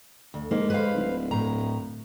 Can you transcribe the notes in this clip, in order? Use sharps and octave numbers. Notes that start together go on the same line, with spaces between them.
D2
G#2 A#3
B4 C5 F5
D1
A2 A#5